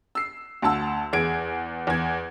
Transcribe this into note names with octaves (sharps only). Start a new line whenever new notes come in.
E6 C7
D2 F#5 A5 E6
E2 G#4 G#6 D7
E2 G#6